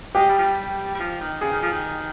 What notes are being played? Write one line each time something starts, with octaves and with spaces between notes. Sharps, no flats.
G#3 G4
G3
F3
G3
G3
F3
D#3
C#3 G#4
D#3
F3
D#3